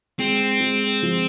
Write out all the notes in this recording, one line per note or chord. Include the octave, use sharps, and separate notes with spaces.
G#3 C4
G#3
F3